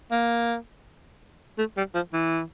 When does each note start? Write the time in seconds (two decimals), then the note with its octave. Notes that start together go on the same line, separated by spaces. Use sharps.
0.11 A#3
1.58 A3
1.77 G3
1.94 F3
2.13 E3